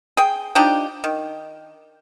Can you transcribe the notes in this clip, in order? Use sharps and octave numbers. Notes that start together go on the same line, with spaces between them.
G#4 G5
F3 D4 D#4 G4
D#3